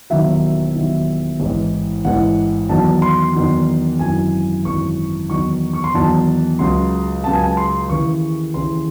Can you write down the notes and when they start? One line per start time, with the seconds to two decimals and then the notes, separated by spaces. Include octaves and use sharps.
0.10 E1 D#2 D#3 F#3 E5
0.75 E1 D#2 D#3 F#3
1.40 A1 G#2 E3
2.05 A1 G#2 E3 F#5
2.69 E2 D#3 F#3 A5
3.02 C6
3.35 E2 D#3 F#3
3.99 G#1 F#2 E3 G#5
4.65 G#1 F#2 E3 C#6
5.29 E2 D#3 F#3 C#6
5.73 C#6
5.84 C6
5.95 E2 D#3 F#3 A5
6.59 C#2 C#3 F#3 C6
7.24 C#2 C#3 F#3 A5
7.34 G#5
7.43 A5
7.57 C6
7.89 D#2 C#3 E3 C#6
8.54 D#2 C#3 E3 C6